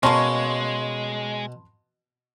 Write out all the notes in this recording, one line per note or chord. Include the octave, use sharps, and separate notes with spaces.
B2 G#3 A#3 C#4 A5 B5 C6